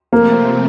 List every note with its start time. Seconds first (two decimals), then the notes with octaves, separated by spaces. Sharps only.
0.12 C3 F3 A3 A#3 C4